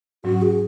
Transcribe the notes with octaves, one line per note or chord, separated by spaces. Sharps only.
G#2 F#3 C#4 F#4
G#4